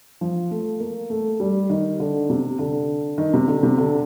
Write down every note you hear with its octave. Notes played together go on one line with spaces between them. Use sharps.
F3
A3
A#3
A3
G3
D#3
D3
C3
D3
D#3
C3
D3
C3
D3